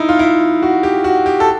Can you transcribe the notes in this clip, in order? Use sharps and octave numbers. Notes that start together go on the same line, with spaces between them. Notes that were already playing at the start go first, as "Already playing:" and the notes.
Already playing: D#4 E4
F4
E4
F#4
G4
F#4
G4
A4